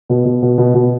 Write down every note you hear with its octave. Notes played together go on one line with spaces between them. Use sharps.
B2
B2
B2
B2
B2